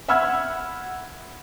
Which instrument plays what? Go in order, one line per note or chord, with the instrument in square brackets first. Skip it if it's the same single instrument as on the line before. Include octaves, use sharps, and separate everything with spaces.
[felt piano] E5 F#5 B5 E6 F6 G#6